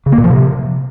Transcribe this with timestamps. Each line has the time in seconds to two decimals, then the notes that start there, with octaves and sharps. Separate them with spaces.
0.06 C#3
0.12 A#3
0.18 A#2
0.24 F3
0.30 C3